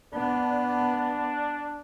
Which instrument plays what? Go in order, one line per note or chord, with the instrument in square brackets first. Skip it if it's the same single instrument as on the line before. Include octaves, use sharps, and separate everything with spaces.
[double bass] B3 [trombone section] D4